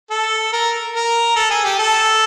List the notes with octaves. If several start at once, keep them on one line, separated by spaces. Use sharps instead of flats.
A4
A#4
A#4
A4
G#4
G4
A4